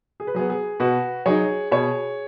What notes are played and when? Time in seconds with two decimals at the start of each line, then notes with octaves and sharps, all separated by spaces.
0.20 G#4
0.27 B4
0.35 F#3 B3 G#4
0.50 G#4
0.80 B2 F#4 B4
1.26 F#3 D#4 G#4 C#5
1.71 B2 G#4 C#5